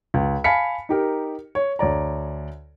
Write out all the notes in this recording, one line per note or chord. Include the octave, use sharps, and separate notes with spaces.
C#2
F5 G#5 A5 B5 B6 C#7
D#4 G4 A#4
C#5
D2 C#5 D5 A#5